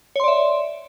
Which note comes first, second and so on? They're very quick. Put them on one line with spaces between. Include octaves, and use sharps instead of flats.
C#5 C6 D5 E5